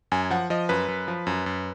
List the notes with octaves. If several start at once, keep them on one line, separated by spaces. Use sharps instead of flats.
F#2 G#5
F3 F#5
F3 D#5
F#2 B4
F#2
F3
F#2
F#2